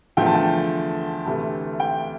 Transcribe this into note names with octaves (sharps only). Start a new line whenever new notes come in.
E2 D3 F3 A3 G5
A5
G5
D2 C3 E3 A3 A5
G5